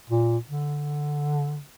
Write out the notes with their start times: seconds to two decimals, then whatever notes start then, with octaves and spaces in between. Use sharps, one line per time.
0.10 A#2
0.49 D3